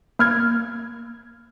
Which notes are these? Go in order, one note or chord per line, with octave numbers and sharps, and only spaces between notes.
A#3 F6 G#6